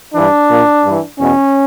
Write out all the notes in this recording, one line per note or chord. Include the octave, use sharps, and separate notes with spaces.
G2 E3 D4
A#2
G2
E3
E2 B2 C#4